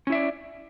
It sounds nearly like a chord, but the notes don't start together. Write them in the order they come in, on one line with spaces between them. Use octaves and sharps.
C#4 E4 E5 D5